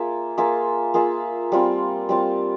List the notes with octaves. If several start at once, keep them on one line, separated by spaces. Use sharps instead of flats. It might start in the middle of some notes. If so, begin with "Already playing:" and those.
Already playing: A#3 F4 G#4 E5
A#3 F4 G#4 E5
A#3 F4 G#4 E5
G3 C4 F4
G3 C4 F4